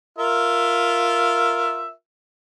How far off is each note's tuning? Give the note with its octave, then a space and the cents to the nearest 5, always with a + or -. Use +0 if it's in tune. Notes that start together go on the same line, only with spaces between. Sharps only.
F4 +0 A#4 +0 E5 +5